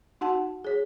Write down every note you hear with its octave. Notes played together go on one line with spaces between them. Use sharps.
D#4 F#4 F#5 A5
G#4 C#5